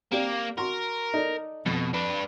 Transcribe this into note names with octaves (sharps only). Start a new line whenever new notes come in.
A#3 C4 G4 D5
F#4 A#4 C6
D#4 A4 D5
F2 B2
D4 B4